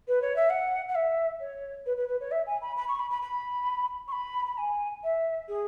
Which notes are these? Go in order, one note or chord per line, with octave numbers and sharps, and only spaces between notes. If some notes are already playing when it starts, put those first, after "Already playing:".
B4
C#5
E5
F#5
F#5
E5
C#5
B4
B4
B4
C#5
E5
G#5
B5
B5
C#6
B5
B5
B5
C#6
B5
B5
G#5
E5
G#4